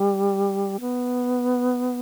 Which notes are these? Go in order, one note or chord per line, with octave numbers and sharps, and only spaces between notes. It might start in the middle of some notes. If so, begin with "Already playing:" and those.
Already playing: G3
B3